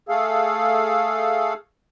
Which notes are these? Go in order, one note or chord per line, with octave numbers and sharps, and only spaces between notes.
A3 G#4 A4 F5